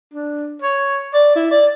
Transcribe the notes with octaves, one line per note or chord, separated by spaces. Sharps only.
D4
C#5
D5
E4
D5